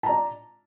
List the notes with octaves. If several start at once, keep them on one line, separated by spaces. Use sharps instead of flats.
D5 A5 A#5